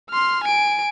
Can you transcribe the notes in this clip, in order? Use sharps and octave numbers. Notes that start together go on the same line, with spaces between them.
C6 F6
G#5 D7